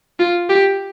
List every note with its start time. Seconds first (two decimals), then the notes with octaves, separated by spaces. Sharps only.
0.20 F4
0.49 G4